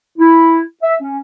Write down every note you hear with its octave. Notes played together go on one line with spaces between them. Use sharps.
E4
E5
C#4